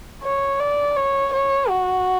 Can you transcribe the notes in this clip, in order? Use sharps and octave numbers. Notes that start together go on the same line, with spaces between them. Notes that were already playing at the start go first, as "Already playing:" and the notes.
C#5
D5
C#5
C#5
F#4